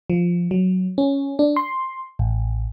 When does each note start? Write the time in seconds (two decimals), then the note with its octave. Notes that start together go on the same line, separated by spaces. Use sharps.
0.10 F3
0.51 F#3
0.98 C#4
1.39 D4
1.56 C6
2.19 A1